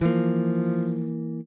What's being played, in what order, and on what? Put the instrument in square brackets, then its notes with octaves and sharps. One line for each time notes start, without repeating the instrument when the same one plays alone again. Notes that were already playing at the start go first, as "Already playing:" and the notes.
[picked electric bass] E3 A#3 [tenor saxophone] F3